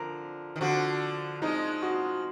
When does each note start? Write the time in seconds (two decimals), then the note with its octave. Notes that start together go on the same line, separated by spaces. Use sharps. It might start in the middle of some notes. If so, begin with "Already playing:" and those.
Already playing: D3 F3 A#4
0.56 D#3
0.61 D3 F3 F#4
1.42 F3 G#3 D#4
1.82 F#4